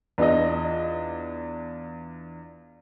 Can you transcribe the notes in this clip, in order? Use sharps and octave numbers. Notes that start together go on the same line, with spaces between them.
E2 D4 F4 D#5